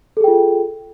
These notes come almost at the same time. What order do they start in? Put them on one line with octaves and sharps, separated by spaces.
A4 G#4 G5 F4